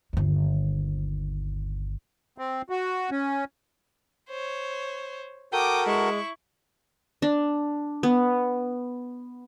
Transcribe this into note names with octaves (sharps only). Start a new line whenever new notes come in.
G1 D#2
C4
F#4
C#4
C5 C#5
F#4 A4 A#4 G5 D6 D#6
G#3 E4 C#6
D4
B3